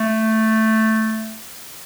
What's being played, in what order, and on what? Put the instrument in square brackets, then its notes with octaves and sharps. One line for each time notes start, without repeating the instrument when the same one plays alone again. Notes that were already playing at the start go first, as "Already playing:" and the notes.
Already playing: [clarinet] A3